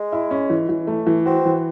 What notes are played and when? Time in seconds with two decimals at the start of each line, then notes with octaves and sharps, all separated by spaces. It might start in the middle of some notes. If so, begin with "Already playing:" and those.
Already playing: G#3
0.12 E4
0.31 C#4
0.50 E3
0.69 E3
0.87 A3
1.07 E3
1.26 C4 F#4
1.45 E3